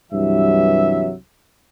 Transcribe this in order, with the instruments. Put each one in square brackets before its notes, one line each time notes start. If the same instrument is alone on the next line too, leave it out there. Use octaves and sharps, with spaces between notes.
[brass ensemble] C2 G2 E3 F#3 E5